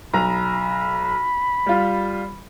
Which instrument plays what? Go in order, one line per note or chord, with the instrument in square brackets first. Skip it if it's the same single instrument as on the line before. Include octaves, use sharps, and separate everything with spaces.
[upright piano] B1 A#5 [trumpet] B5
[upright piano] G3 F4